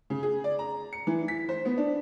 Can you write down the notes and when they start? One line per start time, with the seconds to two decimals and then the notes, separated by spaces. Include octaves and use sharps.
0.10 C#3
0.23 G#4
0.44 D5
0.59 A#5
0.93 C#7
1.07 E3
1.28 B6
1.49 C5
1.65 B3
1.78 D4